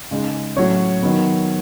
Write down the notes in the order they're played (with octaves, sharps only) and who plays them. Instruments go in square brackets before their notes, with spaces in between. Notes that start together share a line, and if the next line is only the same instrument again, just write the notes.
[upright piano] C#3 G#3 D#4
A2 F#3 C#4 C#5
D#3 F#3 B3